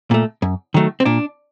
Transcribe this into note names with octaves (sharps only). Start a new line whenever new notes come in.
A#2 A3
F#2
D#3 F#3 A3
C4
A#2 D4